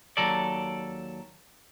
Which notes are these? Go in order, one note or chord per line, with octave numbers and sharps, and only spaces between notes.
D#2 F#3 A4 D5